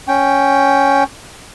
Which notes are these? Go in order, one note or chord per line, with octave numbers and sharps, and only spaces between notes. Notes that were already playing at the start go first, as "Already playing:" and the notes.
C#4 G5